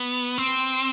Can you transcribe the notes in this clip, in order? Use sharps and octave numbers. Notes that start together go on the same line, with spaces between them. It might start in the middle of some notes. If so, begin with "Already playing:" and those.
Already playing: B3
C4